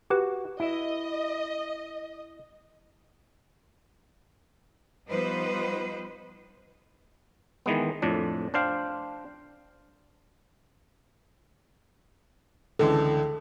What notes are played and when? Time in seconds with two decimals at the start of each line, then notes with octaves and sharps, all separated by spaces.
0.10 F#4 G4 B4
0.60 E4 D#5 E5
5.08 F3 G3 B3 D#4 B4 C5
7.66 D#3 E3 G#3 B3
8.02 F2 A2 D4
8.54 D4 C5 F5 G5
12.79 C#2 D3 E3 A4